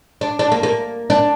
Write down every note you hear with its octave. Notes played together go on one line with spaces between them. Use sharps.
D4
D4
A#3
A#3
D4